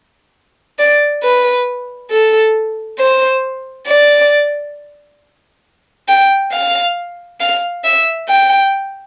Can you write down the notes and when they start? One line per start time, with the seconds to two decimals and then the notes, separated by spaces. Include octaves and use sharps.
0.79 D5
1.23 B4
2.11 A4
2.99 C5
3.87 D5
6.08 G5
6.52 F5
7.40 F5
7.84 E5
8.28 G5